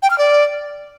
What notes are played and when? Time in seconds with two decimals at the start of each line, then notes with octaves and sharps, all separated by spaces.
0.03 G5
0.10 F6
0.18 D5